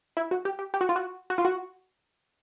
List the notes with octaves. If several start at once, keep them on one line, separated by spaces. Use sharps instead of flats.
E4
F#4
G4
G4
G4
F#4
F4
F#4
F#4
F4
F#4